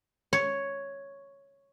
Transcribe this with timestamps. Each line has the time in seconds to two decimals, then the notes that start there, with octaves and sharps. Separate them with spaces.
0.33 C#5